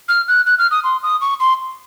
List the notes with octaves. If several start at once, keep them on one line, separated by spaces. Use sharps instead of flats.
F6
F#6
F#6
F6
D#6
C6
D#6
C#6
C6